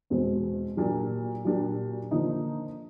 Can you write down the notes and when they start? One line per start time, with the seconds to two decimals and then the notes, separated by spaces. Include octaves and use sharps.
0.10 E2 B2 G#3 C4
0.77 A#2 F#3 A#3 D4 G4
1.45 A#2 F#3 A#3 D4 G4
2.11 D3 F3 A#3 D#4